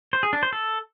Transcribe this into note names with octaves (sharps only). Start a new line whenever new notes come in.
C5
G#4
D4
C5
A4